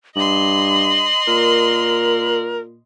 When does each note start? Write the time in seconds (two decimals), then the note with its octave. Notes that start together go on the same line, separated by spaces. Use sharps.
0.16 G2 D#5 C6 F#7
1.28 A#2 A#4